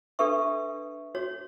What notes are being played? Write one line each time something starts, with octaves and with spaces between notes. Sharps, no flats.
D4 G4 A4 B4 E5 C#6
F#4 C#5